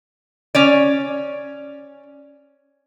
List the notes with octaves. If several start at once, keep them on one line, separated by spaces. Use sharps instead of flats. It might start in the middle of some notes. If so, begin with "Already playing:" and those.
C#4 C#5 D5